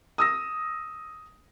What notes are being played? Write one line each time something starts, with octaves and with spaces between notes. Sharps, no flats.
D#6 E6 A#6